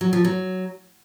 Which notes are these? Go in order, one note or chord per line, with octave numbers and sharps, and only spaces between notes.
F#3
F3
F#3